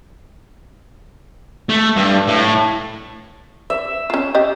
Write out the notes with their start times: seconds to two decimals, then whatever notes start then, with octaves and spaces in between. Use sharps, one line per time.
1.69 A3
1.97 G2
2.28 A2
3.70 E5
4.10 C#4 F4
4.35 G4 D5 D#5